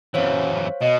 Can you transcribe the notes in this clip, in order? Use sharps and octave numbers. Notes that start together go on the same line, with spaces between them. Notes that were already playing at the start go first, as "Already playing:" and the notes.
F#2 E3 C5 C#5 F5
B2 D#5